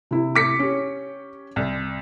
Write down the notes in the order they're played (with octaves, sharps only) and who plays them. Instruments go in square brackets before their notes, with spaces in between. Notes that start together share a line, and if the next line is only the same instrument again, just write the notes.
[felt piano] C3 E4
[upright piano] D6 B6 C#7
[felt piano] C#4 G4
[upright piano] C2